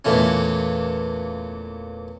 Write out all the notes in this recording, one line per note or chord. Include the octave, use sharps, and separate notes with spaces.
E2 A#2 E3 A3 C#4